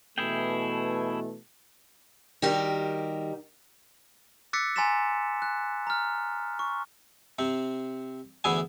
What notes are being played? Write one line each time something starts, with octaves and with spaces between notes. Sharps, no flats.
B2 E3 A3 E4 G#4 G5
D#3 G3 F#4 G4 A#4
D6 E6 F#6 A6 B6 C#7
G#5 A#5 C6 A6 B6 E7
F#6
A#5 F6
C#6
C3 C4
D2 E3 B3 E4 G#4 G#5